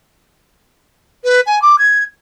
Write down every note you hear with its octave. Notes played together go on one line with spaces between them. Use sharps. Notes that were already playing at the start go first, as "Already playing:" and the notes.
B4
G#5
D6
G#6